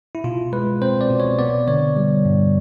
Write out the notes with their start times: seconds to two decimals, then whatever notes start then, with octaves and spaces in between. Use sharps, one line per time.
0.15 E4
0.24 B2 F4
0.53 G#3 B4
0.82 C4 C5
1.01 D5
1.10 B2
1.20 C#5
1.39 B3 D5
1.68 D3 C#5
1.96 G3
2.25 G2